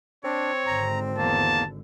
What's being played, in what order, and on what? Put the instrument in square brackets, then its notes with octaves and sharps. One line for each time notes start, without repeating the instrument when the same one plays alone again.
[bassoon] C4 [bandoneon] D4 [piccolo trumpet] C#5
[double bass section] G#1 D3 [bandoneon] A#5
[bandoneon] E2 A#3 [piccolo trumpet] A5